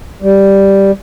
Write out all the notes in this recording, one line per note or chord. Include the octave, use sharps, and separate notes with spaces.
G3